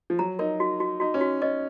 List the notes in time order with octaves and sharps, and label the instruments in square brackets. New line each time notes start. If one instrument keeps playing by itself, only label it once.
[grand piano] F3
[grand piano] F#3 [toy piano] A#5
[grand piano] D#4 [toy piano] A#4
[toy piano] F#4
F#4
[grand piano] D#4 [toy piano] F#4
[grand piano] C#4
[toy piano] F#4
[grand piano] C#4 [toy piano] D#5